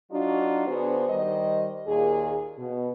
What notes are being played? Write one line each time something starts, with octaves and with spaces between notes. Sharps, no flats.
F#3 D4 D#4 F4 F#4
D3 B3 F#4 G#4 C5
D#3 G3 C5 D#5
D#2 A#2 G#4
B2